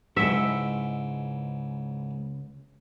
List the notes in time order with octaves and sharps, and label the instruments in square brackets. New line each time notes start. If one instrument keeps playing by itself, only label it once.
[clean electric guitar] C#2 F#5 [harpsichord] G#2 E4 G5 [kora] E5